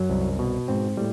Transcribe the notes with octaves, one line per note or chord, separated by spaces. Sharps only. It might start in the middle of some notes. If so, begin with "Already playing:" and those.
Already playing: F#2 F#3
C2
B2
G#2 C4
A2 G3